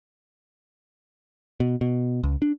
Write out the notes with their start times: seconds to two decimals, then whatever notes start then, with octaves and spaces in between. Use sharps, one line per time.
1.60 B2
1.81 B2
2.23 C#2
2.42 D4